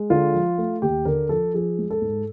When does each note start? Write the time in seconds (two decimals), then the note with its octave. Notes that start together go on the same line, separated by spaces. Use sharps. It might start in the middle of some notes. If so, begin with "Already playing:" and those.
Already playing: G#3
0.10 D3 F4
0.34 F3
0.58 A3
0.82 D#2 G4
1.05 D3 A#4
1.29 F3 A4
1.54 F3 G#4
1.78 G#3
1.90 A4
2.02 G#2